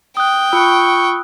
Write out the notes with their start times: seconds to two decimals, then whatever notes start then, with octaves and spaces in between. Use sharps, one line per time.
0.17 G5 D#6 F#6
0.53 F4 B5 C#6 E6 F#6